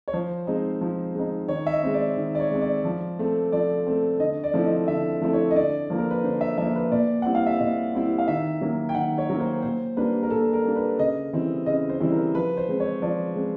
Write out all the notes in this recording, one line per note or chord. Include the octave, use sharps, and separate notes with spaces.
C#5
F3 C5
G#3 C4 D#4
F3
G#3 C4 D#4
D#3 C#5
E5
D#5
G#3 C4
D5
D#3
D5
C#5
G#3 C4
D5
F3
A3 C4
F3 D5
A3 C4
D3 D#5
D5
F3 A3 C4 E4
D#5
D3 E5
F3 A3 C4 E4
C#5
D#5
D3 D5
F3 A#3
A#4
B4
D3 C5
E5
F3 A#3 E5
B4
A#2 D5
G3 C4 E4 F#5
F5
E5
A#2 D#5
G3 C4 E4
F5
D#3 E5
F#3 A#3
G5
D#3 F#5
C#5
F#3 A#3
C5
A#2 C5
G3 A#3 D4 B4
A#4
A#2 A4
A#4
G3 A#3 D4
B4
C#3 D#5
E3 G3 C4 E4
C#3 D#5
C5
E3 G3 C4 E4
A#4
F3 B4
C5
G#3 C4
C#5
F3 D5
G#3 C4